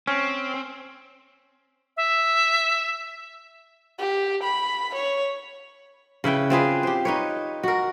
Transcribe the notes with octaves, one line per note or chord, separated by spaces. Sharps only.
C4 C#4
E5
G4
B5
C#5
C#3 E4 B4 G5
C4 F4 G#4 B4
G4 C5
D#4 B4 C#5
F#4 A#4